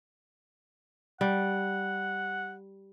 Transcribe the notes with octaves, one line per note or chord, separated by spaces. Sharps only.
G3 F#5